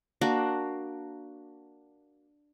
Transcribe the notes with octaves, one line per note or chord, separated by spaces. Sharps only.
A#3 D4 F#4